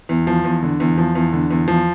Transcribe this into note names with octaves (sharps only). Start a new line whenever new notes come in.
E2
F3
E2
D3
E2
F3
E2
D3
E2
F3